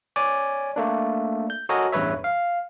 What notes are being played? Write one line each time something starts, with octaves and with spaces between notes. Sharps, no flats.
C#5 D5 G#5 D6
A3 A#3 D4
G6
F#4 A4 A#4 C#5 D#5 G#5
A1 E2 G2 B4 C#5 E5
F5